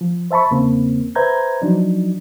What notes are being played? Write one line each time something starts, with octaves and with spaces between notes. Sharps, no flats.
F3
C5 E5 A5 B5 C#6
E2 C#3 A#3 C4
B4 C5 E5 A#5 G6 G#6
F3 F#3 D4 D#4